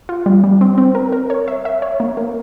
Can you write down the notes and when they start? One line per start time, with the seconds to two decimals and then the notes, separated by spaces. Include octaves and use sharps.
0.09 F4
0.26 G3
0.44 G3
0.61 C4
0.78 C4
0.95 A#4
1.12 A#4
1.30 C#5
1.48 E5
1.65 E5
1.82 C#5
2.00 A#3
2.17 A#3